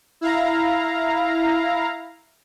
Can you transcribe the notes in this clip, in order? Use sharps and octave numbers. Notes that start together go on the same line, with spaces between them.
E4 F5 A#5